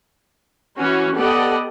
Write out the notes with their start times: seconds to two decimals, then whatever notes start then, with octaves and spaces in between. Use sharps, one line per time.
0.78 E3 C#4 F#4
1.16 B3 G4 A4 D5 D#5 F#5